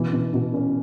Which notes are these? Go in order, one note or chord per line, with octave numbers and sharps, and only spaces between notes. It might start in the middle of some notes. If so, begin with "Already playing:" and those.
Already playing: B2 E3
B2
B2
C#4